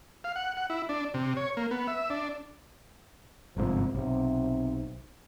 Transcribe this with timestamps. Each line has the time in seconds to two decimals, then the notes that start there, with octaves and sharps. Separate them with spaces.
0.24 F5
0.36 F#5
0.57 F#5
0.70 E4
0.89 D4
1.14 C3
1.37 C#5
1.57 A#3
1.71 B3
1.88 E5
2.10 D4
3.57 G1 G#2 C3 F3
3.95 B1 C3